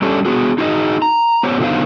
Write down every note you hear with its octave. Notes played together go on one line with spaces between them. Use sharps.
G3 C#4 D4 G4 A4 C#5
B3 F#4 G#4
D#4 F#4 G#4 C#5 D#5
A#5
B3 G4 C5 C#5
D3 F#3 B3 D#4 C5 F5